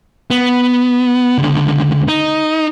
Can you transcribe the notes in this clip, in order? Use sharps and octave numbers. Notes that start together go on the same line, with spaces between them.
B3
C#2 D3
D#4